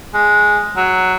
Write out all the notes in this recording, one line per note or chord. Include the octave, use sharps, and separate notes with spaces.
G#3
F#3